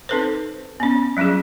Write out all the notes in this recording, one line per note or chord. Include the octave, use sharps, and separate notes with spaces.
C4 D#4 A4 B4 C5
B3 C#4
F#3 G3 C#4 F4 G#4